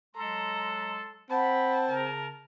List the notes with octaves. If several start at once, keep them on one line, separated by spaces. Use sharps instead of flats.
F#3 G#3 A4 A#5 C6
C4 F#5 A5 B5
C#3 A#4